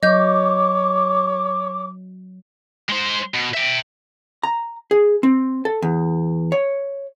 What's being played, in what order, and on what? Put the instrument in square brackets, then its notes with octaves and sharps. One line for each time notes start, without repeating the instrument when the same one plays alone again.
[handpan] F#3 [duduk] C#5 [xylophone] D#5 G6 [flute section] D6
[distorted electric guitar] G#3 C5
B2
E5 G5
[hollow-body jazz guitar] A#5
G#4
C4
A4
E2
C#5